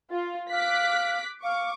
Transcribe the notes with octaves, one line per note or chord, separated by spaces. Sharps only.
F4
F5 D6 F#6 B6
F5 C#6 D6